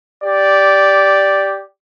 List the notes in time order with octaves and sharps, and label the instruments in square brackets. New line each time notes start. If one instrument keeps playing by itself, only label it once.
[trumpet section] G4 D5